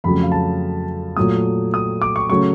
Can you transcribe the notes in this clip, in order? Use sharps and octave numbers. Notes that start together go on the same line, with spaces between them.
F2 C#3 F#3 A3 B5
F5
A5
A#2 F#3 A3 D#6
D#6
D6
C#6
C#3 F#3 A3 C#6